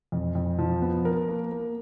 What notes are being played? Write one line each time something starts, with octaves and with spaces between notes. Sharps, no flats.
F2
F2
F3
B3
A#4
A#3
A#3